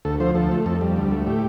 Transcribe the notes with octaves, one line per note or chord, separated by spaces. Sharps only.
D2 A4
F3 C5
D2 A4
A3
F2 A4
G3
D2
A3
A2 G4